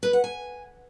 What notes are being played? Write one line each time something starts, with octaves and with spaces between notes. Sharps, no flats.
B4
F#5
G#5